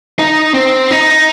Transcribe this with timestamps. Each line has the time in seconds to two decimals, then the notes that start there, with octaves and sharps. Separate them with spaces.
0.19 D#4
0.54 C4
0.91 D#4